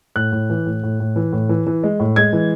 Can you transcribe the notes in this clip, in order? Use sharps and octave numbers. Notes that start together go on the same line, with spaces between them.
A2 F#6
A2
E3
A2
A2
A2
E3
A2
E3
E3
G#3
A2
G#3 G#6
E3